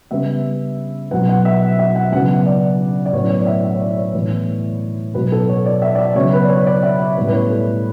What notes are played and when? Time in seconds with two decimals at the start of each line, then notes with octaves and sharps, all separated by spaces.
0.11 C#3 G3 B3 E5
1.11 B2 F#3 B3 F#5
1.29 F#5
1.45 E5
1.62 F#5
1.79 E5
1.96 F#5
2.12 C#3 F#3 B3 F#5
2.29 F#5
2.46 D5
3.06 D5
3.13 A2 F#3 B3 C#5
3.30 C#5
3.41 D5
3.46 E5
3.64 E5
3.74 C#5
3.80 D5
3.97 C#5
4.14 A2 E3 B3
5.14 B2 F#3 B3 B4
5.32 A4
5.49 C#5
5.66 D5
5.82 E5
5.95 D5
5.99 E5
6.15 C#3 F#3 B3 C#5
6.33 B4
6.44 D5
6.49 C#5
6.67 D5
6.83 E5
6.99 E5
7.17 A2 G3 B3
7.27 B4
7.33 C#5
7.50 A4